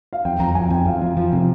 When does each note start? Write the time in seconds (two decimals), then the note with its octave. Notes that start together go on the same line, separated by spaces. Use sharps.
0.13 F5
0.25 F2 G5
0.40 F2 A#5
0.55 F2 G#5
0.70 F2 G5
0.86 F2 F5
1.01 F3
1.17 F3
1.32 C3